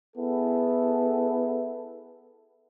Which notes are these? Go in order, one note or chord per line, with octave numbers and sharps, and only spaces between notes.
B3 E4 G#4 A4